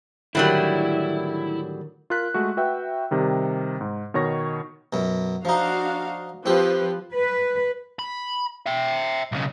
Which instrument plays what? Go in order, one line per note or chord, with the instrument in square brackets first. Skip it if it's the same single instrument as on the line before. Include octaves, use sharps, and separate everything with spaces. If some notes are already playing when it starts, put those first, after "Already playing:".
[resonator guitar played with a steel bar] A2 F#3 G3 [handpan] D3 D#3 A#4 [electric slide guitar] E4
[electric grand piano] F4 A#4 F#6 B6
G#3 A3 F#4
F#4 B4 E5 G5
C3 D#3 G3
G#2
B2 D#3 C#5 C#6 A#6
[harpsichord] F#2 B2
[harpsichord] F3 D#4 [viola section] D4 F#4 F5
[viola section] F3 B4 [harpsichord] C4 G4
[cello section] B4
[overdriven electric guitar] B5
E5 G5
B1 C#3